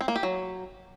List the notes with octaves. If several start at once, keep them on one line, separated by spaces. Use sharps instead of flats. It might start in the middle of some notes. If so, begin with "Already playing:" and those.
C4
A#3
G4
F#3